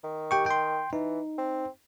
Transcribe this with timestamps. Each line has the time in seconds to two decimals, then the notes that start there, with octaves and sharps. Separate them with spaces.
0.04 D#3
0.31 G4 G5 C#6
0.46 G5 C6
0.93 E3 D#4
1.38 C4